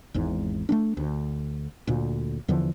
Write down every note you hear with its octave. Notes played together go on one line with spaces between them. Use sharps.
G#1 E2 G#2
A3 A#3 D4
D2
D2 A#2
E2 D3 E3 F3